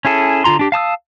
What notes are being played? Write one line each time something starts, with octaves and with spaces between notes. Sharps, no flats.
C#4 E4 G#4 A4
D3 F4 A#5 C6
D4 G4
F5 A5 D#6 E6